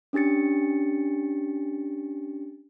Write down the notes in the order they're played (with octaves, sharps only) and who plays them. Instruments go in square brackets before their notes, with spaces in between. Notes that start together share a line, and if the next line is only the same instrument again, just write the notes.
[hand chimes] C#4 D4 G4 A6 C#7